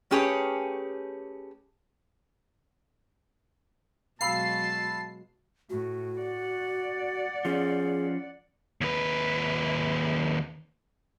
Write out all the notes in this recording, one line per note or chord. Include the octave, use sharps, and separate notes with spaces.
A3 C#4 G4 G#4 B4 C#5
B2 F#3 G#3 F5 A5 B5 E6 C7
A2 F#4
D5 F#5
F3 C#4 G#4
D#2 B4